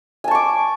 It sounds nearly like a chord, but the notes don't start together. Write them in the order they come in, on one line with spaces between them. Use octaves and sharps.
G#5 A5 C#6 D6